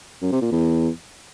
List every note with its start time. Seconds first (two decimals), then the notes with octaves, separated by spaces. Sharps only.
0.22 F#2
0.32 C3
0.42 A#2
0.52 E2